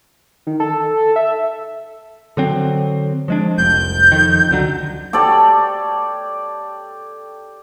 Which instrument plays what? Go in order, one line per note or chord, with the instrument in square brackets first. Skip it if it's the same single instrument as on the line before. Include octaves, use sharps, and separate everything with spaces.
[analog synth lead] D#3
A4
E5
[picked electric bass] D3 F#3 C4
F3 G#3 D4
[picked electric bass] F1 C2 [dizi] G6
[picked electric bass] F2 D#3
C#2 D3 F#3
[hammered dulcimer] G4 A4 C#5 D5